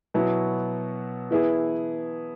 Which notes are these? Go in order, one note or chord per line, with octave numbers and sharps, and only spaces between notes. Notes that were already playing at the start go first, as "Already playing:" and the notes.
B2 F#3 B3 E4
E3 B3 E4 G#4